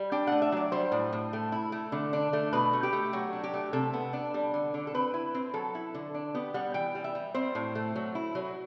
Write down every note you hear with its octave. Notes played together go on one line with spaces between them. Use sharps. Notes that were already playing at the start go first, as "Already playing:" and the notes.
Already playing: G3
D4 G5
A3 F#5
E5
F#3 D5
G3 C5
A2
A2
A3
E4
A3
D3
D4
A3
B2 B4
A3
G4
A3
F#3 F#4
D4
G4
A3
C3 A4
B3
D4
G3
D3
D3
A4
C4 B4
E4
C4
F#3 A4
E4
D3
D4
B3 G4
G3 F#5
E3 G5
G3
E5
G3
C4 C5
A2
A3
F#3
E4
F#3